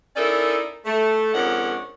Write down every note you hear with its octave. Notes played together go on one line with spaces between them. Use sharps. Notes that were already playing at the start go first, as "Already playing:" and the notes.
C#4 D#4 E4 A4 A#4 D5
A3
F2 G#2 D#3 C#4 D4 F#5